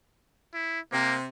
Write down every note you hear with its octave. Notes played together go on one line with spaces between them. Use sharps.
E4
C3 A#3